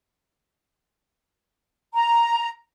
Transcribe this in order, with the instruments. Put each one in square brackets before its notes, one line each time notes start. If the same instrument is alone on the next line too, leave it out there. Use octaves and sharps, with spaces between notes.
[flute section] A#5